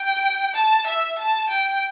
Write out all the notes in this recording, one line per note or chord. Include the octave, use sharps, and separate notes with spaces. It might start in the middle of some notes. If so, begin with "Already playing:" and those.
Already playing: G5
A5
E5
A5
G5